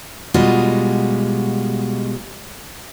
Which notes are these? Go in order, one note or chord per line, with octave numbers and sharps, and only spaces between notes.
B2 G3 G#3 F4 F#4